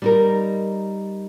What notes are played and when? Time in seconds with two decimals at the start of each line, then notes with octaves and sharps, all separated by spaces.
0.02 G3 D#4 A#4